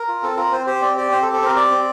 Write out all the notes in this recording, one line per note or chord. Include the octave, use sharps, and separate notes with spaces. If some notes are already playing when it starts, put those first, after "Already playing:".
Already playing: A#4
F4
C4 A4
F4 A#4
C4 C5
G4 C5
C4 D5
G4 D5
C4 C5
A4
G4
A4
C4 A#4
G4 D5
C4